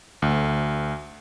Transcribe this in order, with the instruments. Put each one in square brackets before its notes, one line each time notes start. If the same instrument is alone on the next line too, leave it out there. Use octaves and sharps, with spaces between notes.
[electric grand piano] D2